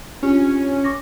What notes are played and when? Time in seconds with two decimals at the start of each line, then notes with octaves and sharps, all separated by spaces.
0.23 C#4 D4 F4 G4
0.84 C#6 D6 A#6